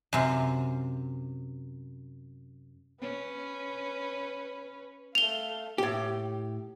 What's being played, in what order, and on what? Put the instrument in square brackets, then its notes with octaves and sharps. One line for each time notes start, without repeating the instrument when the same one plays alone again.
[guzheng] F#2 C3
[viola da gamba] C#4 [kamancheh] B4
[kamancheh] A3 F5 [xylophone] F7 G7
[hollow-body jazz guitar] A2 G4